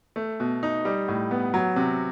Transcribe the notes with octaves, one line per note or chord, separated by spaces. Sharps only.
A3
B2
D#4
G3
A2
B3
F#3
C3